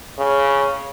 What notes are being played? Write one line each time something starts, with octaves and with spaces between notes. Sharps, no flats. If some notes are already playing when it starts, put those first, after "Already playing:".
C#3